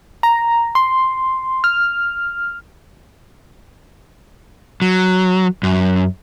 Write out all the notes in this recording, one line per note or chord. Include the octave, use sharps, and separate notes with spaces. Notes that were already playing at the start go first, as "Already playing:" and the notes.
A#5
C6
F6
F#3
F#2